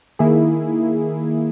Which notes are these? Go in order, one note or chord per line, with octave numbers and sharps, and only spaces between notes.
D#3 A#3 E4 G#4